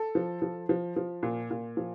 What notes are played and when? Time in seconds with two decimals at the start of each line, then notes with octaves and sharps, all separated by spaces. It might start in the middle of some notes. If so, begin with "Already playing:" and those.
Already playing: A4
0.15 F3
0.42 F3
0.69 F3
0.96 F3
1.23 A#2
1.51 A#2
1.77 F3